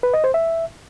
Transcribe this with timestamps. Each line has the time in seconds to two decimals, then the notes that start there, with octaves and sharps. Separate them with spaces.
0.03 B4
0.14 D#5
0.24 C5
0.34 E5